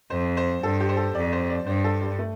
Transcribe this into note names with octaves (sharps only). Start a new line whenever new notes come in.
F2 C5
C5
G2 A4
G4
C5
A4
F2 D5
C5
D5
G2 C5
A4
G3
A3